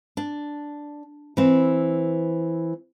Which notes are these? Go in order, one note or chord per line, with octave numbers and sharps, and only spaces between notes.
D4
E3 C4